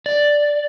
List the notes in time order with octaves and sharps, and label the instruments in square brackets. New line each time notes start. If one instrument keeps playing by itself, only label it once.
[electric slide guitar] D5